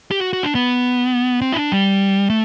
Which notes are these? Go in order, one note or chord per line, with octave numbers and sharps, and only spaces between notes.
G4
F#4
F#4
D4
B3
C4
E4
D4
G3
A3